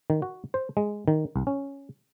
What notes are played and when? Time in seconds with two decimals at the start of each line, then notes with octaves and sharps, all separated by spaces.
0.10 D#3
0.22 F#4
0.54 C5
0.77 G#3
1.08 D#3
1.36 C2
1.47 C#4